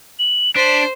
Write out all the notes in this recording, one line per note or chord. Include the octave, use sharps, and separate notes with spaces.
F#7
D4 C5 B6